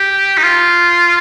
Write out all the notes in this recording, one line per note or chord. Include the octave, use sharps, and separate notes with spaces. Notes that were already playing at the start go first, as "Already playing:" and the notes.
Already playing: G4
D#4
F4